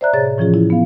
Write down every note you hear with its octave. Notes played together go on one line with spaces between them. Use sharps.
C5 D5 E5 A#5 F#6
A2 C3 G#4 C#5 A6
A2 E3 F3 C#4 F4 G#4
E4
B3 F5